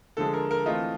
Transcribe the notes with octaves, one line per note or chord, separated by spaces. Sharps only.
D3 F3 G#3 A4
A#4
A#4
E3 A3 C4 F4 D#5